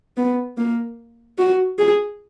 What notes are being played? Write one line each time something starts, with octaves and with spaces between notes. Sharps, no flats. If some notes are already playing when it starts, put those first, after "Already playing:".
B3
A#3
F#4
G#4